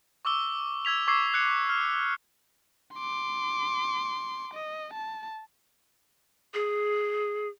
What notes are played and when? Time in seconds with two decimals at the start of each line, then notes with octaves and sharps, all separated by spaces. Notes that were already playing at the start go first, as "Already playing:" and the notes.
0.25 C#6 D6 E6 G7
0.85 E6 G#6 B6 F7
1.07 C#6 D6 E6 G#6 C7
1.34 F#6 C#7
1.69 F6
2.94 C6 D6
4.53 D#5
4.93 A5
6.54 G#4